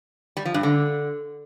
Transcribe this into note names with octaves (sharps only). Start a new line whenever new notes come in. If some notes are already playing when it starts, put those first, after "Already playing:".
G3
F3
G2
D3